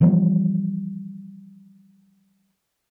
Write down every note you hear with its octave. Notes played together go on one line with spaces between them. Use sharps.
E3 F3 G3 B3